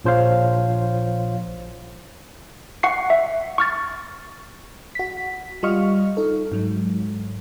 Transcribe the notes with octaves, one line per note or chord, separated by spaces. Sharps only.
A#1 F3 C5 C#5 F5
F#5 C#6 C7
E5
C#6 F6 A6
F#4 B6
G3 F4 D#5 C#6 F6
D#4 A4
G#2 F#3